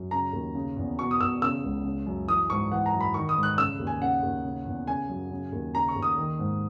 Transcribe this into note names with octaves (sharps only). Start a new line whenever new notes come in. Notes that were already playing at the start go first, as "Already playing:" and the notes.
Already playing: F#2
C#3 A#5
D#2
C#3
E2
B2 C#6
D#6
E2 E6
C#3 E6
C#2
C#3
F#2
E3 D#6
G#2 C#6
E3 F#5
A#5
F#2
B5
D#3 C#6
D#6
G#2
F#6
C#3 E6
D#2
G#5
C#3 F#5
D#2
C#3
E2
C#3 G#5
F#2
C#3
D#2
C#3 A#5
C#6
D#2
D#6
D#3
G#2